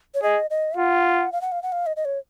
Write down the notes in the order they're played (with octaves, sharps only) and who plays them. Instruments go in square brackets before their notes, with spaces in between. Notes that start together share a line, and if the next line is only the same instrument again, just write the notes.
[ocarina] C#5
[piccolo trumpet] G#4 [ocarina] D#5
[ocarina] D#5
[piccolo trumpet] F4 [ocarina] F#5
[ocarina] F5
F#5
F5
F#5
F5
D#5
D#5
C#5